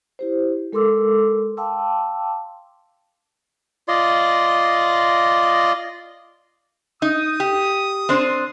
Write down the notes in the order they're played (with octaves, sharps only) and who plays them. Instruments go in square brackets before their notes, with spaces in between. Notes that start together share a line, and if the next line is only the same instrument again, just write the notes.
[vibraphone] E4 G4 C5
G#3 A4 A#4 C6 D6 E6
F5 G5 A5 C6 D6 E6
[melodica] F4 D5 D#5 C6
[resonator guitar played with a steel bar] D#4 [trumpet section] D#6
[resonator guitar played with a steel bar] G4
C4 D4 C5